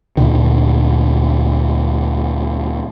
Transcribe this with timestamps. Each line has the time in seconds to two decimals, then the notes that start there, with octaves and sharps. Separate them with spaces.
0.17 D2 A#2 D3 D#3